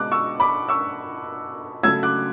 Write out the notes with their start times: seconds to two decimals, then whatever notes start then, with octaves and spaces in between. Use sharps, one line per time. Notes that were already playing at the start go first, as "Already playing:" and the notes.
Already playing: B2 G#3 D6 F#6
0.12 C#6 E6
0.40 B5 D6
0.69 C#6 E6
1.83 C#3 F#3 A3 E6 G#6
2.03 D6 F#6